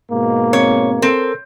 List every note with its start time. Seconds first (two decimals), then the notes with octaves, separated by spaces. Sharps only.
0.11 G#2 B2 A#3
0.53 C4 C#5
1.02 C4 A4 A#4